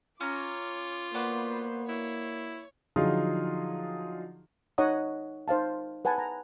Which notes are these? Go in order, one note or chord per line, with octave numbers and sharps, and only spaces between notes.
C#4 F4 C#5 A#5 D6
A#3 B3 F#4 B4 C5 D5
E4 C#5
D3 F3 F#3 D#4 F4 G#4
D#4 C#5 D#5 F#5 A#5 D#6
D#4 C5 F5 A5
B4 F#5 G#5 A5
A#5